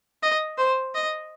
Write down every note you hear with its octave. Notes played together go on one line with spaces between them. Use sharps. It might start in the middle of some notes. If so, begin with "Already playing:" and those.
D#5
C5
D#5